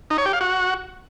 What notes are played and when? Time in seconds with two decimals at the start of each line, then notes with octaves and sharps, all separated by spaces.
0.10 D#4
0.18 C#5
0.26 G4
0.33 F5
0.41 F#4